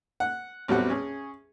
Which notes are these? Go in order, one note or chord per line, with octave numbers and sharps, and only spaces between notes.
F#5
A1 E2 F#3 G3 C4 F#5
C#4 G#4